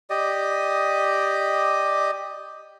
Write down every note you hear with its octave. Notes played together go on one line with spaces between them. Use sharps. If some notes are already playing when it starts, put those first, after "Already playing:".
G4 D5 D#5